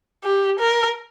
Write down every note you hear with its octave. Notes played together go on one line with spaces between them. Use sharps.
G4
A#4